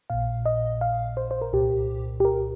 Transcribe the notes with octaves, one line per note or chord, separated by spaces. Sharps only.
A#1 A#2 F5
D#5
F5
C5
C5
A#4
C2 A#2 G4
G4
A#4